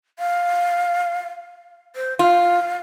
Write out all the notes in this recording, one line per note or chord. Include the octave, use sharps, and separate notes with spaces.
F5
C5
F4 F5